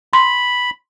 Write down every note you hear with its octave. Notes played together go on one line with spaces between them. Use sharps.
B5 C6